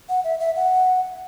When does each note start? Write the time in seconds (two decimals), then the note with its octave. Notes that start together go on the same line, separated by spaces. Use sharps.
0.09 F#5
0.24 E5
0.40 E5
0.56 F#5